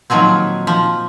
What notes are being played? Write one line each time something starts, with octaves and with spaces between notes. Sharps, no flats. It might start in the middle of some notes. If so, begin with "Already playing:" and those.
A#2 D#3 F3 F#3 C4
F3